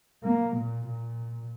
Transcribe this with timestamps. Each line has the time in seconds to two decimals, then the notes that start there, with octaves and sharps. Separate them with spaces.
0.23 A#3
0.55 A#2
0.87 A#2